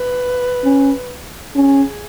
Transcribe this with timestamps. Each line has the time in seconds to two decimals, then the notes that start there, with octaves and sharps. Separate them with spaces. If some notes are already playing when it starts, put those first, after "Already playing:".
Already playing: B4
0.64 C#4
1.55 C#4 G#4